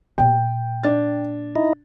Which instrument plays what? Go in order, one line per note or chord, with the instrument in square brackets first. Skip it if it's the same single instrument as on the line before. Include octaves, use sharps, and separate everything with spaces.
[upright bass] A#2 A#3 [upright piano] G5
[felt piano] D4 A6
[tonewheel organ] D#4 E4 D#5